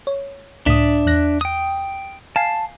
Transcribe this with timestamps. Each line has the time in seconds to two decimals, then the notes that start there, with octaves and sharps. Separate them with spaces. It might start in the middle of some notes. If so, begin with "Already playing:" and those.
0.07 C#5
0.66 C#2 A2 D4 E5 D#6
1.07 E2 F#6 A#6
1.41 G5 D#6
2.36 F5 G#5 A5 C7